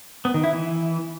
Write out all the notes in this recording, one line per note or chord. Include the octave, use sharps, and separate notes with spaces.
B3
D#3
E4
E3